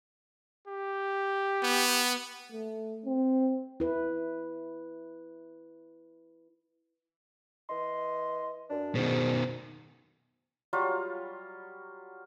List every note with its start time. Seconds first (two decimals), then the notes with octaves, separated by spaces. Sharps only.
0.67 G4
1.63 B3
2.52 A3
3.06 C4
3.80 E4 B4
7.69 E3 D#5 C6
8.70 F#2 D4
8.95 G#2 B2 D#3
10.73 F#3 G3 F4 F#4